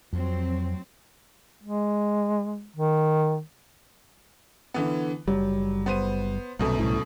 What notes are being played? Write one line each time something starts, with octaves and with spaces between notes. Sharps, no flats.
F2 F#3 C4
G#3
D#3
D3 E3 B3
F#1 F#3 G3
B3 C5 D#7
C2 F#2 B2 A3
C2 A2